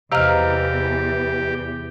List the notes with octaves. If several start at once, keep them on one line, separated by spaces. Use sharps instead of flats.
E2 C3 E3 G4 D#5 F5 A#5 F6